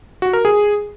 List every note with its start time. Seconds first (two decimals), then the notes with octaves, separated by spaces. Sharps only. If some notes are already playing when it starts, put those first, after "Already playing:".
0.22 F#4
0.33 A#4
0.45 G#4